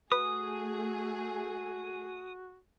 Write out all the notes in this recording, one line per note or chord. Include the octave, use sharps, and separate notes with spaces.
A3 F#4 G#4 B4 D#6